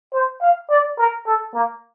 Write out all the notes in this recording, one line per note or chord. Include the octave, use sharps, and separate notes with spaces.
C5
F5
D5
A#4
A4
A#3